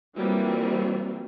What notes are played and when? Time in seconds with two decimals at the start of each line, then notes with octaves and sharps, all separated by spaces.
0.16 E3 F#3 G3 A#3 C4 F4